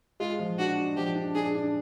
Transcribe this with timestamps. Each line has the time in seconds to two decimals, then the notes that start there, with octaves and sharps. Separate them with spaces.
0.20 G#3 F4
0.39 F3
0.58 D4 F#4
0.77 D4
0.96 F3 G4
1.15 D4
1.35 D4 G#4
1.55 D4